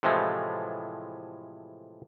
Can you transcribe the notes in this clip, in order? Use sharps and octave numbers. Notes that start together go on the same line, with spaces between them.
A2 C3 E3 F3 G#3 A3